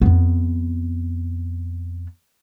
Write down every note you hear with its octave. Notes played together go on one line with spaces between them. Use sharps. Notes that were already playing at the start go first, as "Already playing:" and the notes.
F2 B3